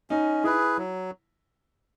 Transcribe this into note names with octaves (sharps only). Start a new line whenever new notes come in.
C#4 D#4
E4 G#4 B4
F#3